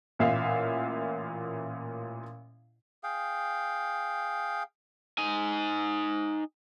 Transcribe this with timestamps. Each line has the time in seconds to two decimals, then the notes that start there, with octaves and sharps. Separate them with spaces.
0.19 A1 A#2 E5 F5
3.03 G#4 F5 G5
5.18 D#4 G#5